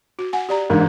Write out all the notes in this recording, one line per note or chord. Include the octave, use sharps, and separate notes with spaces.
F#4
F#5 G#5
G4 D5 A#5
G#2 E3 A#3 D4